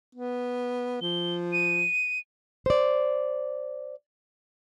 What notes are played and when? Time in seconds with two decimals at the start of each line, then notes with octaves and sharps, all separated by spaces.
0.15 B3
1.01 F3 G7
1.52 D#7
2.66 C5 D5